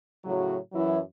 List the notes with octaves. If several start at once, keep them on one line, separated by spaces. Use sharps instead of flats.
A2 C#3 F#3
F#2 E3 F#3 E4